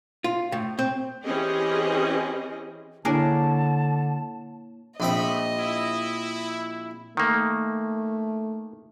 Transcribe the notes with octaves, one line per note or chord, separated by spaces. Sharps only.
F4
A2
C4
E3 C4 C#4 G4 G#4 D#5
D3 A#3 D4 E4 G#4 A#4 C#5 A5
A#1 A3 C4 D#5 E5 B5
E4
D#3 A3 A#3